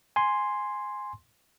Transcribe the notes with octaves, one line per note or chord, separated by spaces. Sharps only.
G#5 C6